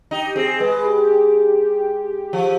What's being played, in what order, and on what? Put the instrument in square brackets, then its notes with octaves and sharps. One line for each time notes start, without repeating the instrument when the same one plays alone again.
[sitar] D#4 [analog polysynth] G4
[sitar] C4 [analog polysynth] G#4
[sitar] G#3 [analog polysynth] B4
[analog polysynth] G4
[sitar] F3